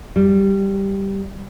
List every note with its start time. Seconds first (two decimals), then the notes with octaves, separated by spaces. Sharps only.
0.16 G3